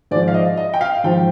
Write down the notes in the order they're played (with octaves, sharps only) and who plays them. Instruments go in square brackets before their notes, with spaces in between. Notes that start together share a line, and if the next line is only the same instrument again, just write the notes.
[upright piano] G#2 D5
F3
F5
D#5
D#5
G5
F5
G#2 F3 G5